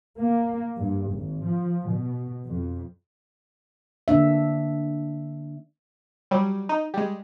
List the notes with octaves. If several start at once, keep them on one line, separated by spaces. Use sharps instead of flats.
A#3
G2
G#1
F3
B2
F2
D3 A#3 D4 E5
F#3 G3
D#4
G3 G#3